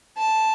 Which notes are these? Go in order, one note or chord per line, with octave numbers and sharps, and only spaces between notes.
A5